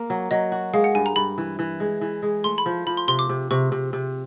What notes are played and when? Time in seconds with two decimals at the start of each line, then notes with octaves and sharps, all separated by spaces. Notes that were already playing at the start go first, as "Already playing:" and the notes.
Already playing: A#3
0.10 F#3
0.31 F#3 D#5
0.52 F#4
0.73 G#3 F5
0.84 F#5
0.95 G2 G#5
1.06 A#5
1.16 G2 B5
1.38 E3
1.59 E3
1.80 G#3
2.01 E3
2.23 G#3
2.44 A3 C6
2.58 B5
2.66 F3
2.87 F3 B5
2.97 C6
3.08 C3 C6
3.19 D6
3.29 C3
3.51 C3 C#6
3.72 C3
3.93 C3